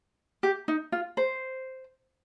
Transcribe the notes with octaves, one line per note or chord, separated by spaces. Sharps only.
G4
D#4
F4
C5